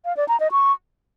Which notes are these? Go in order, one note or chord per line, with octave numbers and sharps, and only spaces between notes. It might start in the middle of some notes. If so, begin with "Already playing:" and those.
F5
D5
A#5
D#5
C#6